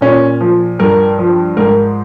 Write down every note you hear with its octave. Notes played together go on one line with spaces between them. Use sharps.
A#2 C#4
F3
G2 A#4
F3
G#2 A#4